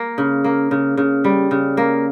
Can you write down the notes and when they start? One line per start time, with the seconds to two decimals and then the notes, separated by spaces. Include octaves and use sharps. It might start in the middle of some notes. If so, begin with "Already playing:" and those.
Already playing: A#3
0.18 C#3
0.44 A#3
0.71 C#3
0.97 C#3
1.24 G3
1.51 C#3
1.77 A#3